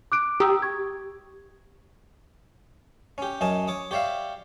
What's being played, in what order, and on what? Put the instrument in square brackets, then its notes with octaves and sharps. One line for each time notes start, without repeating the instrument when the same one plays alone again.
[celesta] D6 F#6 D7
[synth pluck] G4 [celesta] A#5 D#6 E6
[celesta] C#6 G#6
[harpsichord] C#4 G4
F#2 C#4 D#5 G#5 A5
C#5 D6 D#6
G4 C#5 D5 E5 F5